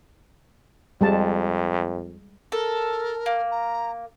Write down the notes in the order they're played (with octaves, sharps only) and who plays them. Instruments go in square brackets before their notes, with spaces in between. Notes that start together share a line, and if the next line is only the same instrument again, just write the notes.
[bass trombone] F2 [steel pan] G3 G#3 A5
[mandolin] A4 [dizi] A#4
[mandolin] A#3
[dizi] A#5